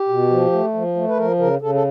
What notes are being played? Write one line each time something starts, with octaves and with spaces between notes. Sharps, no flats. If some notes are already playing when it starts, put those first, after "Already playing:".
Already playing: G4
B2
F3
A3
F3
A3
B4
F3 A#4
C#3 A#4
C#3 A4
A4